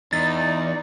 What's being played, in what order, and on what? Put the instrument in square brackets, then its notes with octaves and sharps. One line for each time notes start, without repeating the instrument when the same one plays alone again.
[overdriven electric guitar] E2 [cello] D#4 D5 [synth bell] A6